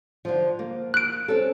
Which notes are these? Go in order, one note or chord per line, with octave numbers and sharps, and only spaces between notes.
D3 F3
A#3
F#6 D7
C4 C#4 A4